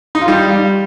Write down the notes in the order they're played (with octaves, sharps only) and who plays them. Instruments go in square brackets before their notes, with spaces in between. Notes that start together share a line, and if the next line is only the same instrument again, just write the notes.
[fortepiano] D#4
F4
G3